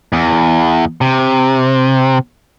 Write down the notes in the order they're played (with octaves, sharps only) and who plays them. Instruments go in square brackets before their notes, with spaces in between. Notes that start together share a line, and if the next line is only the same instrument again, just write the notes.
[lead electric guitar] E2
C3